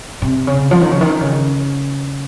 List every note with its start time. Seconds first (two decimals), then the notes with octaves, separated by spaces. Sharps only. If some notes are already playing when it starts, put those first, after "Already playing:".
0.22 C3
0.47 C#3
0.71 F3
0.81 D#3
0.91 C#3
1.01 D#3
1.21 C#3